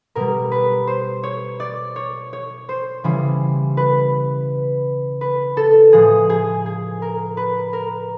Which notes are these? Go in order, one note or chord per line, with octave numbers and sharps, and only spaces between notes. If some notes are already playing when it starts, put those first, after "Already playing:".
B2 G3 A#4
B4
C5
C#5
D5
C#5
C#5
C5
C#3 E3 G3
B4
B4
A4
A2 F3 G#3 G#4
G#4
G#4
A#4
B4
A#4